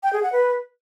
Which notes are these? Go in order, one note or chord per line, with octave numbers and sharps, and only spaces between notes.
G5
G#4
F#5
B4